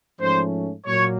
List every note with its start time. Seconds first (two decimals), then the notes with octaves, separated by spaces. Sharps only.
0.20 G#2 F3 A3 C#4 C5
0.86 A#2 F#3 A#3 C#5